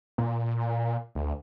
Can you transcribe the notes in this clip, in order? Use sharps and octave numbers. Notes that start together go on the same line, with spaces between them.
A#2
D2